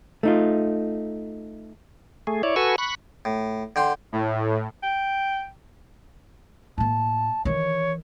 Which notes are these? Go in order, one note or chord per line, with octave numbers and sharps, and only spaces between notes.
A3 D#4 F4
A3 G#4
E4 C#5 D5
F#4 A4 B4 G#5 C#6 E6
B5 C#6 F#6
A2
D3 G5 C6
A2
G5
A2 A#3 A5
D#3 E3 C#5